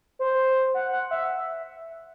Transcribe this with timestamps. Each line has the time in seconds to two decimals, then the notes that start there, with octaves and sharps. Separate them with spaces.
0.19 C5
0.74 F#5
0.93 F#5
1.11 E5